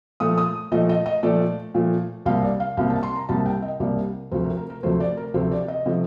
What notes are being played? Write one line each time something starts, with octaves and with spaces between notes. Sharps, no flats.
A#2 F3 A3 D#6
D#6
A#2 F3 A3 D#5
D#5
D#5
A#2 F3 A3 D5
A#2 F3 A3
C2 C3 G3 A#3 F5
D5
F5
C2 C3 G3 A#3 F5
A5
C6
A#5
C2 C3 G3 A#3 A5
G5
D#5
C2 C3 G3 A#3 D5
D2 C3 F3 A3 C5
A#4
A#4
A#4
D2 C3 F3 A3 C5
D5
A#4
D2 C3 F3 A3 C5
D5
D#5
C3 F3 A3